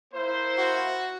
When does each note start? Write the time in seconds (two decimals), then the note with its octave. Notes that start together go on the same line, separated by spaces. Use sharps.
0.14 A#3 E4 C5
0.58 F#4